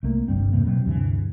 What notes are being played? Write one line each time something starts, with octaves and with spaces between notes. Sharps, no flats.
C2 A3 A#3
G1 C2 G2 C4
E2 A2 C3 A#3
B2 F#3 C4
D2 G2 C3 E3